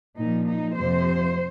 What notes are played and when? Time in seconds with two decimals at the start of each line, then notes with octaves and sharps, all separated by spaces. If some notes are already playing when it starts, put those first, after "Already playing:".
0.17 A#2 F3 D#4
0.47 D#4
0.76 F2 C3 F3 C5